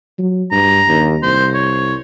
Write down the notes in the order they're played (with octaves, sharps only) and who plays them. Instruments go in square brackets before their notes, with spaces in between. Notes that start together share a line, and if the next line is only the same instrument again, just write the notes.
[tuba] F#3
[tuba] G2 [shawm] A#5
[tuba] D#2
[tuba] C2 [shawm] C5
[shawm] C#5